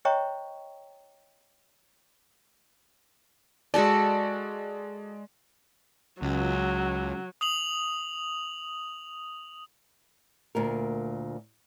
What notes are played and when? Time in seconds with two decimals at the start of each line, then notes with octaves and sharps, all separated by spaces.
0.05 C5 C#5 D#5 G5 A#5 C#6
3.74 G#3 F#4 A4 D5 A5
6.22 C#2 F#3
7.41 D#6 F7 F#7
10.55 D2 A#2 A#4